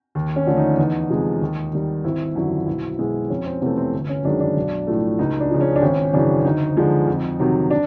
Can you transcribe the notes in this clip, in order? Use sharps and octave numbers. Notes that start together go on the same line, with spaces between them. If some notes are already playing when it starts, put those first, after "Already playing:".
D#2
C#4
D3 F3 A3
D#4
E2 D#4
C3 F3 G#3
D#2
D#3 G3
G#1 E4
F#2 D3 F3 E4
B1 E4
B2 G#3 E4
F2 C#4
C4
C3 E3 A3 B3
C4
G1
C#4
F#2 D#3 G#3 D4
D4
B1
A2 F3 A3
C#2 D#4
D4
C#3 F3
C#4
D4
G#1 C#4
F#2 C#3 E3 D4
D2 D#4
D3 F3 G#3
F2
C3 D#3 F#3
D4